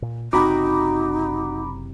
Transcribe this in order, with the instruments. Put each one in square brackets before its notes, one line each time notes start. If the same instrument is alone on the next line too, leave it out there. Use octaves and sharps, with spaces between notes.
[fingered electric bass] A#2
[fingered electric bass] F#1 C3 C4 [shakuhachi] D#4 [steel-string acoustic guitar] F#4 [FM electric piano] A#5 B5 D6